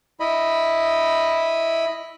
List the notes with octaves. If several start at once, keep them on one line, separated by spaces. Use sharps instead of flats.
E4 D#5 B5